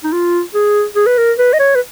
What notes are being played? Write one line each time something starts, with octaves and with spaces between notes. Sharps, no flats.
D#4
F4
G#4
G#4
B4
A#4
B4
D#5
C#5
B4